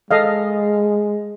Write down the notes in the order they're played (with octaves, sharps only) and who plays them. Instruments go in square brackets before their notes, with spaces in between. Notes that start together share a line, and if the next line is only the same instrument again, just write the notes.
[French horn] G#3 [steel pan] A4 D#5 F5